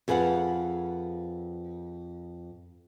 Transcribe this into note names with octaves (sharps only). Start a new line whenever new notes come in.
F2 G#4 B4 F5 F#5